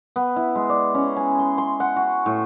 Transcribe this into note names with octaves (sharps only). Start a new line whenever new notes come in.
B3
E4
G#3
D5
C#4
G#5
C6
C6
F#5
F#4
A2